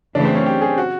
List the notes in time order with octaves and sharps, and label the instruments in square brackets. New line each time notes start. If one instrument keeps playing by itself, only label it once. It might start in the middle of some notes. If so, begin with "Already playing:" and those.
[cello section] F#2 C#3 E3 A3 [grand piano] D4
[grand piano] C4
C#4
G4
G#4
F#4